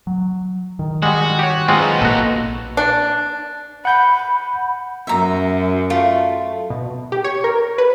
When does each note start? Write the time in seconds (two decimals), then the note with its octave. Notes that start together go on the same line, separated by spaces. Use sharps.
0.07 F#3
0.79 D#3
1.02 G3 G#3 F#4
1.39 G4 C#5
1.68 G#3 B3 C4 D#4 F4
2.02 A#1 A#2 A#3 F#4 A4
2.77 D4
3.85 F#5 B5 G6
5.07 F#2 E5 A#5
5.90 A3 F4
6.70 B2
7.12 G4
7.24 C#5
7.44 A#4
7.78 B4